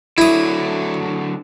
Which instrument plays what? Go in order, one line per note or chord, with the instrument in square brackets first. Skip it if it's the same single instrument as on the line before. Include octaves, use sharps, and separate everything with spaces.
[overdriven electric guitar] D3 F#3 [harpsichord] E4 D#6